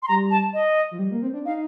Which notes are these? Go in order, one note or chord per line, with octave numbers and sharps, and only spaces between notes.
C6
G3 A#5
A5
D#5
F3
G3
A#3
C4
D4
D#4 F5